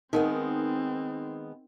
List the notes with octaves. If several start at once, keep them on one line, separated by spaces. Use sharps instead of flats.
D#3 G#3 B3 C4 D#4 A#4 F#5